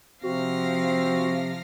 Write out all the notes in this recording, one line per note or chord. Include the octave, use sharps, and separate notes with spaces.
C3 F3 C4 F#4 F5 A#6